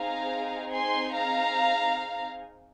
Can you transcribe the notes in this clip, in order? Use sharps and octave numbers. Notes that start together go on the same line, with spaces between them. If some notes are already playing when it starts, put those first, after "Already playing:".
Already playing: C4 D#4 G#4 F5 A#5
G#5 C6
F5 A#5